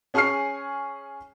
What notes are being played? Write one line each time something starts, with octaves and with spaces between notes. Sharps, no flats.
C#4 G#4 G#5 C#6 F6 C7